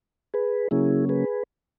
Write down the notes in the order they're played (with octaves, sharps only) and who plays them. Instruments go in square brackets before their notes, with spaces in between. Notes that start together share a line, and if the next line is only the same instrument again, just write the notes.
[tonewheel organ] G#4 B4
C#3 F#3 A#3 C#4 E4 G#4
G#4 B4